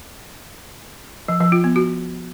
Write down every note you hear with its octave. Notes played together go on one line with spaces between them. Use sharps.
F3
F3
F4
B3
F#4